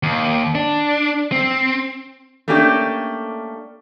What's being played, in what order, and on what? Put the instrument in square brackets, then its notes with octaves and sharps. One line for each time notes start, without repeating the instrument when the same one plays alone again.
[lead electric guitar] D#2
D4
C4
[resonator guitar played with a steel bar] A3 A#3 C#4 D4 G4